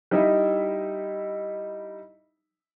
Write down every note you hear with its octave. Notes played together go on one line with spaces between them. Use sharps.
G3 D#4 E4 D#5 E5